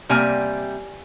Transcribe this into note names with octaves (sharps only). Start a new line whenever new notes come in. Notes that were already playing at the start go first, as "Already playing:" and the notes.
C3 G3 A#3 G#5